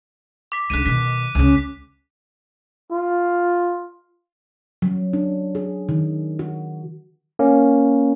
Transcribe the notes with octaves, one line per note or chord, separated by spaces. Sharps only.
D6 B6
C#2 D3 F#6 B6 D#7
B2 D#3 B6
C#2 C#3
F4
F#3
D4
G#4
D#3
F#4
A#3 C#4